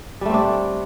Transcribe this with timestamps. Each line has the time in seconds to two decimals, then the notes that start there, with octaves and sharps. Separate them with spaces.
0.21 G3
0.26 A3
0.30 C4
0.34 D4